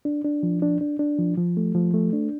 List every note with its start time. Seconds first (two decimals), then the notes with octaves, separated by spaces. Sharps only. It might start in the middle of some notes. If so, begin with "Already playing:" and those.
0.05 D4
0.24 D4
0.43 F3
0.62 D4
0.81 D4
0.99 D4
1.19 F3
1.37 F3
1.57 A3
1.75 F3
1.94 A3
2.13 D4